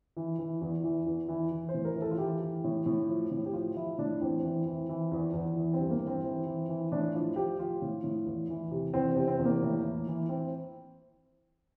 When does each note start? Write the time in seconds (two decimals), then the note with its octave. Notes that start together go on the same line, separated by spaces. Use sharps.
0.17 E3
0.39 E3
0.61 E2
0.84 E3
1.06 E2
1.29 E3
1.51 E3
1.69 C5
1.74 A2
1.85 A#4
1.96 E3
2.02 A4
2.11 F4
2.18 E3 G4
2.41 E3
2.64 A2
2.86 A2
3.09 F3
3.31 A2
3.46 G4
3.53 F3 F4
3.76 F3 E4
3.98 A2 D4
4.21 E2 C4
4.44 E3
4.66 E3
4.89 E3
5.12 E2
5.34 E2
5.56 E3
5.73 C4
5.79 G2
5.91 A#3
6.02 E3
6.07 C4
6.24 E3
6.47 E3
6.69 E3
6.92 A2 D4
7.14 F3 F4
7.36 F3 G4
7.59 F3 F4
7.82 A2
8.04 A2
8.26 E2
8.49 E3
8.71 C3
8.94 E2 C4
9.12 C4
9.17 C3
9.28 C4
9.39 E2
9.45 A#3
9.62 A2
9.84 E3
10.07 E3
10.29 E3 C4